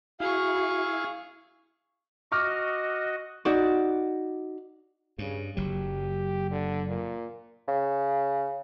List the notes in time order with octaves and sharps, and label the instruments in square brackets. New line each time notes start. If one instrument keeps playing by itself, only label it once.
[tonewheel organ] E4 [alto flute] F#4 [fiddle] G#4 C#6 [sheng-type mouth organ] F5
[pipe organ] F#4 D#5 [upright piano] C#6 D6 F6
[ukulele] D#4 F#4 D5
[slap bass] G2 [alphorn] C#3
[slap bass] F#1 F#3 [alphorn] G4
[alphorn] D3
A#2
[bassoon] C#3